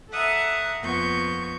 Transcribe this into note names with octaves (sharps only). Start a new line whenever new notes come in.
A4 E5 F#5 A#5 D#6
F2 A#3 B3 F4 C#6 G6